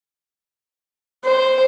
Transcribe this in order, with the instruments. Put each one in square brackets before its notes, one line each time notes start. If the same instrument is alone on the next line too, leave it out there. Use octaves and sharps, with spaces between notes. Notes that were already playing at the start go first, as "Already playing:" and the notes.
[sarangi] C5